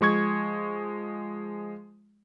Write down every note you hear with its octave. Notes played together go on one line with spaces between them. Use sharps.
F3 G#3 C#6 G#6